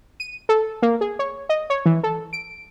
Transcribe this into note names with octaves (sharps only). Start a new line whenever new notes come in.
D#7
A4
A#3
G#4
C#5
D#5
C#5
E3
A4
D7